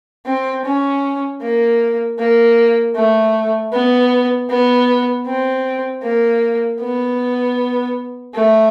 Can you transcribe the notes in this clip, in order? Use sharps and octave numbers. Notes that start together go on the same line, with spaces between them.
C4
C#4
A#3
A#3
A3
B3
B3
C4
A#3
B3
A3